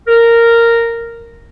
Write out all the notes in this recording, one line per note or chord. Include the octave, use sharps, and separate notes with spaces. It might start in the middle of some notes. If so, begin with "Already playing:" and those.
A#4